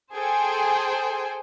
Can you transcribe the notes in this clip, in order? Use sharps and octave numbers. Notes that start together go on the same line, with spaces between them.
G#4 A4 C5 G5 G#5